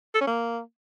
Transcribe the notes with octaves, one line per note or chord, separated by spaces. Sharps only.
A4
C#4
A#3